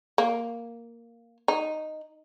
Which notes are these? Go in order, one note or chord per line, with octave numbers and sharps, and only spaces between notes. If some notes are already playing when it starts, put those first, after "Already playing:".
A#3
D#4